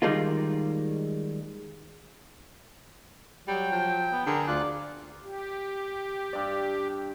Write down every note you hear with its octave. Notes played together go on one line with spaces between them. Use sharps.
D#3 G3 G#3 A#3 F4
F#3 G3 G5
F3
B3
D3 G#4 A#4
D2 F4 D5 F#6
G4
G2 D5